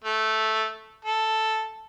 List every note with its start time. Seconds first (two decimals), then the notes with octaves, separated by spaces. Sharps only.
0.04 A3
1.05 A4